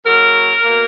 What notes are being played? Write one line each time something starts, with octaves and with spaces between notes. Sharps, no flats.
C#3 F#3 A#3 A#4
B2 A#3